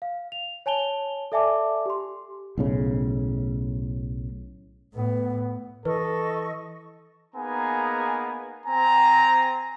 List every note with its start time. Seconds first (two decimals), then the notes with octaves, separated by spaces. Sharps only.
0.02 F5
0.32 F7
0.66 C#5 G#5 A5 F7 G7
1.32 A4 D5 E5 G#5 A5 D6
1.86 G4 C6
2.58 B1 A2 C#3
4.94 A2 B3
5.85 E3 A4 B4 D#5 C#6
7.35 A#3 B3 D#4 G#4 G#5 A#5
8.66 C4 G#5 A#5